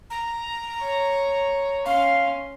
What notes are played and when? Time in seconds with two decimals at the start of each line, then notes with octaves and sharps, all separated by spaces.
0.10 A#5
0.82 C#5
1.86 C#4 F5 C6